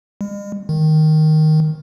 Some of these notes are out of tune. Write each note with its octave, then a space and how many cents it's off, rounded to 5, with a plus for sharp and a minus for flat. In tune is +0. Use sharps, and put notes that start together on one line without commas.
G#3 -45
D#3 +0